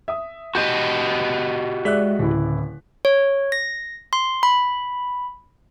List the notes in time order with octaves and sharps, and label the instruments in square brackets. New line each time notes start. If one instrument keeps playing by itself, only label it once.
[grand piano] E5 D#6
[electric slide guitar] F#4 G4 D#5 [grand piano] G6
[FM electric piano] G#3 D5 E5 [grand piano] F#6 B6
[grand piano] D1 E4 [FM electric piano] C#3
[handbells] C#5
A#6
C6
B5